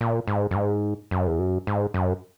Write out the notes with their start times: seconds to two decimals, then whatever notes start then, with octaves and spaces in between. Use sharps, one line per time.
0.01 A#2
0.27 G#2
0.51 F#2
0.55 G#2
1.11 F#2
1.27 E2
1.39 F#2
1.67 G#2
1.94 F#2